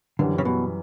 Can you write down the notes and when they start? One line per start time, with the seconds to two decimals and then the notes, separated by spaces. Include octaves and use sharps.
0.19 F#2 D3 E3 G3
0.38 C#3
0.45 B2